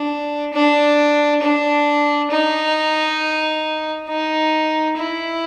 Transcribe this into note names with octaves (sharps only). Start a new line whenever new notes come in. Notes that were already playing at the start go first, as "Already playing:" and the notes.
Already playing: D4
D4
D4
D#4
D#4
E4